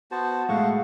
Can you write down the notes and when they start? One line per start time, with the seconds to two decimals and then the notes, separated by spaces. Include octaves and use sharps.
0.11 B3 F#4 C5 A5
0.49 A2 G#3 A3 F5 F#5 C#6